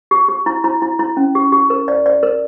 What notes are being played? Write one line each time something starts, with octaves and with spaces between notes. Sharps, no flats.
G4
G4
E4
E4
E4
E4
C#4
G4
G4
A#4
D5
D5
A#4